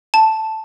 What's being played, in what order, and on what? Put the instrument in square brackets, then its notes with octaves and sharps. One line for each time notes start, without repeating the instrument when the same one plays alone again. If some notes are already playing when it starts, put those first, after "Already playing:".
[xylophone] A5